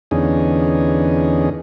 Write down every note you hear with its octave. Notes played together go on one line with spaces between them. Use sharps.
E2 D3 B3 C#4 D#4 G#4